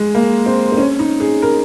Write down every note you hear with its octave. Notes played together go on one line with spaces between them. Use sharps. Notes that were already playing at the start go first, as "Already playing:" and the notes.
Already playing: G#3
A#3
C4
C4
C#4
D#4
G#4
A#4